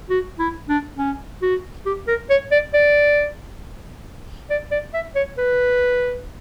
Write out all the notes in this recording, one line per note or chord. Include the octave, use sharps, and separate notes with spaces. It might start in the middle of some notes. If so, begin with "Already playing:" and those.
F#4
E4
D4
C#4
F#4
G4
A#4
C#5
D5
D5
D5
D5
E5
C#5
B4